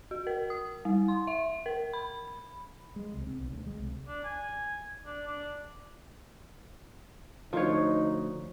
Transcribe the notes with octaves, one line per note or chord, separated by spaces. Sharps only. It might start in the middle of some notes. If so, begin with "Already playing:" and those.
F#4
A#4
D#6
G3
C6
E5
A#4
B5
G#3
C2
C4
B1
D2
G#3
C2
D4
G#5
D4
D4
D2 F3 D#4 C#5